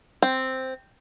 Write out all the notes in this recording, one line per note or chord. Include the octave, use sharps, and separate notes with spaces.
C4